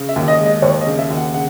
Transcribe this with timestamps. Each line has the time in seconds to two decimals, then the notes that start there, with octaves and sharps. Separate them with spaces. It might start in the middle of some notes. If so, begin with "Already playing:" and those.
Already playing: C#3
0.09 E5
0.16 D#2
0.28 D#5
0.39 G#3
0.46 D#5
0.62 D#2 C#5
0.81 D#5
0.87 C#3
0.98 E5
1.10 D#2
1.17 F#5
1.34 C#3 F#5